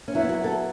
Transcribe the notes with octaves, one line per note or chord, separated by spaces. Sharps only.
C#4
F#2 F#3 B3 E4
F#4
A4